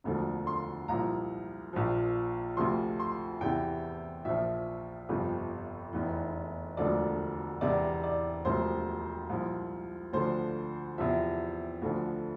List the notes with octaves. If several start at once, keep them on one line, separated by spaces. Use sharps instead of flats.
E1 D2 D3 F3
C6
C2 A#2 F3 A#5
A#1 A#2 F3
D2 C3 F3 C6
C6
E2 C3 E3 G5
A#1 A#2 F3 E5
G1 F2 C3 F3
F1 E2 E3
E1 D2 D3 F3 D5
E1 E2 C3 E3 D5
D5
E1 D2 C3 F3 C5
C2 A#2 F3
D2 D3 F3 C5
E2 C3 F3 E5
D2 D3 F3